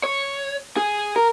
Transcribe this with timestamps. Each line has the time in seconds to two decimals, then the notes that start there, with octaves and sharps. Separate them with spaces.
0.04 C#5
0.77 G#4
1.16 A#4